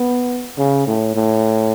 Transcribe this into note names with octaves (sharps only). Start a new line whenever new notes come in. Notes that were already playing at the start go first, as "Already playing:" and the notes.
Already playing: B3
C#3
A2
A2